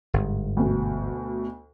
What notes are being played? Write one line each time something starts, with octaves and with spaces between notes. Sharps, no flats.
G1 G#2
D2 B2